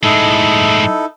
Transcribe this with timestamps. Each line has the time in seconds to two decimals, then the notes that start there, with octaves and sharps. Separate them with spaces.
0.03 A2 G#3 D#4 E4 A4